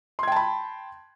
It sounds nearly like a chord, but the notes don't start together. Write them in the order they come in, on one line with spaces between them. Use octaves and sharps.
C6 G#6 G5 A5 B5